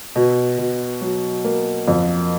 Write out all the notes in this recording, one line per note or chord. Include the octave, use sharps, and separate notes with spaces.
B2
B2
F#3
A#3
F2